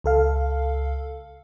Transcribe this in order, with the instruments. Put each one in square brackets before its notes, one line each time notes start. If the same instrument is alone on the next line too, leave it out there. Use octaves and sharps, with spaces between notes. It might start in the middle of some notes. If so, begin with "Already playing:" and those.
[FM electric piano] C#2 A4 F5